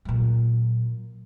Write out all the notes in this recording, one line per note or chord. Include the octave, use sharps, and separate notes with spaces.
A#2 F#3